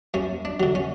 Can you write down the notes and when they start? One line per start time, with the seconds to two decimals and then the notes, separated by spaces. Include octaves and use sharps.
0.14 F#2 C#4
0.45 D4
0.60 D3 F#3
0.75 C#4